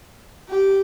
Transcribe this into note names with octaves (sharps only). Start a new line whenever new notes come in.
G4